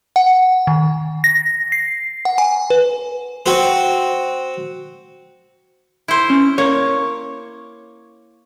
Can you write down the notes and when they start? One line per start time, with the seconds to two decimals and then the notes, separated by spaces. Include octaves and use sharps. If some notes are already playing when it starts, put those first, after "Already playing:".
0.16 F#5
0.67 D#3
1.24 A#6
1.72 C7
2.25 F#5
2.38 G#5
2.70 B4
3.46 C4 F#4 C5
6.08 E4 C5
6.30 C#4
6.58 A#3 C#5